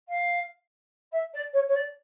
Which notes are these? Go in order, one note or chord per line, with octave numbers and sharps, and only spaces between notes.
F5
E5
D5
C#5
C#5
D5